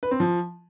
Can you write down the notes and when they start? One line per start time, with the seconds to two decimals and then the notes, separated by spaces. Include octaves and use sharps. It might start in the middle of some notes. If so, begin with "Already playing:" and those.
0.03 B4
0.11 C4
0.20 F3